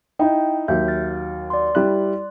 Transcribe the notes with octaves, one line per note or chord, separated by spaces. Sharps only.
D#4 E4 G5
D#2 F#3 E5 G6
F6 A6
D5 C6
G3 E4 F#6